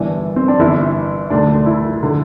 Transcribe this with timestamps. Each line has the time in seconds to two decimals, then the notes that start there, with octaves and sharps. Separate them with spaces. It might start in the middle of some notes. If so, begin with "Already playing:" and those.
Already playing: G1 G2 E3 D4
0.36 C4
0.48 D4
0.60 G1 G2 E3 E4
1.30 D2 D3 D4
1.54 D4
1.66 E4
2.03 D3